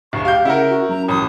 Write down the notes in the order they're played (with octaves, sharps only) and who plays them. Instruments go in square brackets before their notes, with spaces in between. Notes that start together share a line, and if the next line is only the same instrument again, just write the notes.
[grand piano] D1 [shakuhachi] C#6
[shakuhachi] G4 [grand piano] F5 G6
[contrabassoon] C#3 [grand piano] E4 A#4 [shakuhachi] F#5
[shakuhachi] F#4
[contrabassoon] F#2 [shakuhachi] A#5
[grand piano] A1 [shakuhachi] D#6